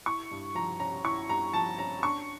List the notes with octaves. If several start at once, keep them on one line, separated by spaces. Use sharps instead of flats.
E4 C#6
G2
F3 A#5
C#4 A#5
E4 C#6
G2 A#5
F3 A5
C#4 A#5
D4 C#6